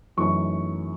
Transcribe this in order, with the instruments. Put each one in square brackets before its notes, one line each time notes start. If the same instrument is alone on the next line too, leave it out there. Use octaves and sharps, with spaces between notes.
[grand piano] F#2 E3 A3 D#4 C#6